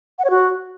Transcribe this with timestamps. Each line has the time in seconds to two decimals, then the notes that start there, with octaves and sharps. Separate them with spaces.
0.19 F#5
0.24 C#5
0.30 F#4